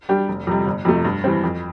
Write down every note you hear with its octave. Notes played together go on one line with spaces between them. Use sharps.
G3 D4 G4
F1
F2 C3 G3
G1
F2 C3 F3 A3
G2
E3 G3 C4
F2